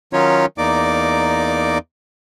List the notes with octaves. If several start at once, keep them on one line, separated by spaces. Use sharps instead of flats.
D#3 F#3 C#4 D#4 F4 C#5
E2 A#3 D#4 D5 D6